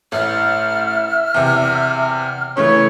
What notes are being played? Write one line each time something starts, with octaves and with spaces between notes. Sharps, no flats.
A1 E5 F6
E2 C3
C#3 E3 A3 C#5